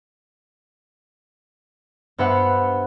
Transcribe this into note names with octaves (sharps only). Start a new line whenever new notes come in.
G2 B3 C5 E5 F#5